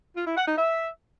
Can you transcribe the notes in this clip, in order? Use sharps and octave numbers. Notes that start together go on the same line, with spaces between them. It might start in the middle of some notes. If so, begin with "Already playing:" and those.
F4
E4
F#5
D#4
E5